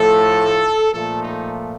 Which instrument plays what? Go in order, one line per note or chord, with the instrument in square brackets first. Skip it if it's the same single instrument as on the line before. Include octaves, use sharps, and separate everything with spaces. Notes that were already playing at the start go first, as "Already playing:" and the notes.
Already playing: [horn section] A2 F3 A3 A4
A#2 F3 A3 A4
D#4